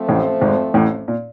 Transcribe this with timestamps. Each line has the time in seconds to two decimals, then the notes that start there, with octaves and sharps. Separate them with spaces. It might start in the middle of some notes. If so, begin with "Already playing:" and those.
Already playing: F3 A3 C4
0.08 A1 A2
0.41 G#1 G#2
0.74 A1 A2
1.08 A#2